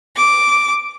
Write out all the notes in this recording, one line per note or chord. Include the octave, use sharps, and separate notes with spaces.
D6